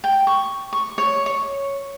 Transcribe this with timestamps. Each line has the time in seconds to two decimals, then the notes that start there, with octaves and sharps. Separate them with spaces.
0.04 G5
0.27 C#6
0.73 C#6
0.98 C#5
1.26 C#5